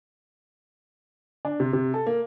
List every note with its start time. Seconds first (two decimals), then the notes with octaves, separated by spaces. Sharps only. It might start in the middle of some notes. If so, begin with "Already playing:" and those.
1.45 D4
1.60 C3
1.73 C3
1.94 A4
2.06 A#3